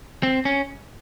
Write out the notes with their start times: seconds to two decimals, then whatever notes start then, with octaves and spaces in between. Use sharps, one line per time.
0.23 C4
0.45 C#4